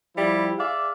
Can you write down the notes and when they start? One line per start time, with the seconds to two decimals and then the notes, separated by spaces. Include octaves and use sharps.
0.16 F3 G3 E4
0.58 G#4 D5 E5 F5